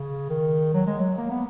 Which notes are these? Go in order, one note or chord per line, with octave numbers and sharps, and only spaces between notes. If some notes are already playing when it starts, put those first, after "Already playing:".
Already playing: C#3
D#3
F#3
G#3
F#3
A#3
B3